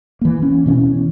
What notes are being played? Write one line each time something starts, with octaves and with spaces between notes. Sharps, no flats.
E3 A#3
C#4
B2 E3 C#4